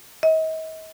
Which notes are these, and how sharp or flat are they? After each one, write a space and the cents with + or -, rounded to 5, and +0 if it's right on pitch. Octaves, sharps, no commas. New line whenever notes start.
D#5 +40